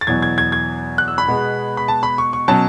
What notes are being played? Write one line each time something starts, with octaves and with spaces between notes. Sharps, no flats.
A6
E2 B2 F#3 G#6
G#6
G#6
G#6
F#6
E6
B5
B2 G#3 B3
B5
A5
B5
C#6
C#6
B2 F#3 C#4 A5